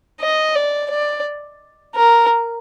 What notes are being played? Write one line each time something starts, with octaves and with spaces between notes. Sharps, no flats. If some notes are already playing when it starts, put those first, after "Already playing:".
D#5
D5
D5
A#4